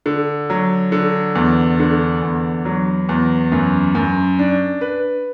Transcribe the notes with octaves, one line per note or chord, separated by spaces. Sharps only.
D3
F#3
D3
E2
D3
E2
F#3
E2
F#2
F#2
D4
B4